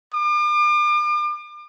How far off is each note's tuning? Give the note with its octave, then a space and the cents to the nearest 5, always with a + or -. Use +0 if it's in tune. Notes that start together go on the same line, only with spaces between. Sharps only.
D6 +40